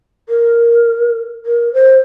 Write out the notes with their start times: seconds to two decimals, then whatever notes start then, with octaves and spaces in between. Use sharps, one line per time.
0.29 A#4
1.46 A#4
1.74 C5